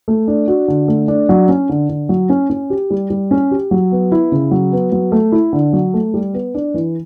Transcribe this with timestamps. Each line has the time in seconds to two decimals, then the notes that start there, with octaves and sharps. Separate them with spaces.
0.08 A3
0.28 D4
0.48 F#4
0.68 D3
0.88 A3
1.08 D4
1.29 F#3
1.49 C#4
1.69 D3
1.89 D3
2.09 F#3
2.29 C#4
2.50 C#4
2.70 G4
2.90 G3
3.10 G3
3.31 C#4
3.51 G4
3.71 F#3
3.92 B3
4.12 E4
4.32 C#3
4.51 F#3
4.72 B3
4.92 F#3
5.12 A3
5.32 E4
5.53 D3
5.73 F#3
5.94 A3
6.14 G3
6.34 B3
6.55 D4
6.74 E3